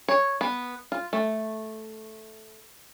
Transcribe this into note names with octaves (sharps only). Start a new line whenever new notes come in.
C#5
B3
F4
A3